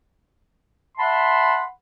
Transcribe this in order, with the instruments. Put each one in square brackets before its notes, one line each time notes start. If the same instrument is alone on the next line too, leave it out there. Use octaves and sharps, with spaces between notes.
[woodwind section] E5 F#5 A5 B5 C6